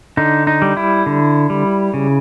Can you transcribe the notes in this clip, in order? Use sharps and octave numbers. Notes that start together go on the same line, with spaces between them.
D3 D#4
D#4
G3
E4
D3
G3
C#3